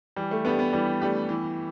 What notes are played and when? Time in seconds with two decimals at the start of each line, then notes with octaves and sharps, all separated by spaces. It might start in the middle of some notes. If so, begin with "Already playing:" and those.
0.16 E3 G3
0.31 A3
0.45 A3 B3 D4 G4
0.59 B3
0.73 E3 G3
1.01 A3 D4 G4
1.29 E3